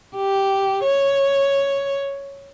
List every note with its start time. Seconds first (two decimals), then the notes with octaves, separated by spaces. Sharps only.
0.16 G4
0.84 C#5